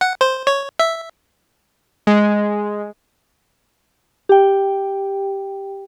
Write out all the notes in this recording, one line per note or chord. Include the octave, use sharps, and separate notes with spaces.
F#5
C5
C#5
E5
G#3
G4 G5